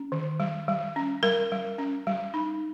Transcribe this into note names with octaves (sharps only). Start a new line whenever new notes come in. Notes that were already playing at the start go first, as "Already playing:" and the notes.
Already playing: C#4
D#3
G3
G3
C#4
G3 A#4
G3
C#4
G3
D#4